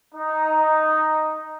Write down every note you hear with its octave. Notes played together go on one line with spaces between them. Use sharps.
D#4